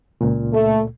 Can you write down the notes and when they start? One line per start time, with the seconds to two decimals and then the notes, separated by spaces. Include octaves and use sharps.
0.21 C#2 A#2
0.53 A3